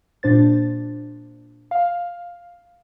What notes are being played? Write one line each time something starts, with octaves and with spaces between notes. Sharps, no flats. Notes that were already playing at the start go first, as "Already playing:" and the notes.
A#2 D4 C5 A6
F5